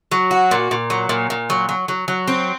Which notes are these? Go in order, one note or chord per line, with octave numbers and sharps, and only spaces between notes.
F#3
F#4
A#2
A#2
F#3
A#2
A#2
F#3
F#3
F#3
F#3
C4